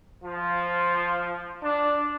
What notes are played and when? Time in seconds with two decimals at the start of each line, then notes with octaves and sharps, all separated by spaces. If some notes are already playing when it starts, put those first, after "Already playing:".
0.24 F3
1.63 D4